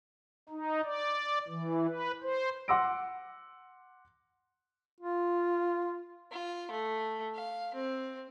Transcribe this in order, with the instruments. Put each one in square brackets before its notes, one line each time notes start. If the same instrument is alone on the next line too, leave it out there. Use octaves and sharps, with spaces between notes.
[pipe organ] D#4
D5
E3
B4
C5
[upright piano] F#5 C6 D6 E6 A#6 D7
[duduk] F4
[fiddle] F4
A3
F5
C4